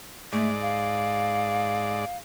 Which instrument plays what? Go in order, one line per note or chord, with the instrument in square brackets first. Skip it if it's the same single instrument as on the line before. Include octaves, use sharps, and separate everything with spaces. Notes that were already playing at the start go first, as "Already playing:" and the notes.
[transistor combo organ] G#2 D5 [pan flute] A3
[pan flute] F5